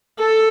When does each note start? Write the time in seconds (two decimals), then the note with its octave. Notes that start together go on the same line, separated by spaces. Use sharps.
0.19 A4